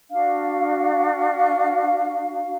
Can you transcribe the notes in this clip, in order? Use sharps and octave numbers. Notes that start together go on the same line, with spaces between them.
D4 F#4 F5